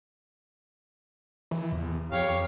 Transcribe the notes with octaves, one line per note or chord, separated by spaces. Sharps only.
E3
E2
F2 G4 C#5 F5